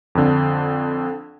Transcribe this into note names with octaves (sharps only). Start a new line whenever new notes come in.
F2 D3